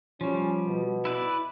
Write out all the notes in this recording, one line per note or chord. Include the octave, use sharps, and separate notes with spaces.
F3 G3 C#4
B2
E4 B4 D5